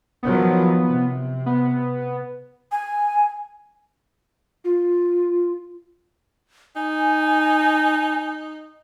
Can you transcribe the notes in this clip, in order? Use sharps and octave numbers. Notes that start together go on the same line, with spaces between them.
D#3 F3 F#3 B3
C3
B3
G#5
F4
D#4 G#5